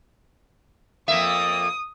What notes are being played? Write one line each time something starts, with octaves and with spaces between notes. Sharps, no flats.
F2 A#3 E5 D#6